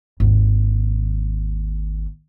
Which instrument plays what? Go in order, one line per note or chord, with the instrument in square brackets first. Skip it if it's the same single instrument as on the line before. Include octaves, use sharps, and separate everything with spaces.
[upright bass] G#1 D#2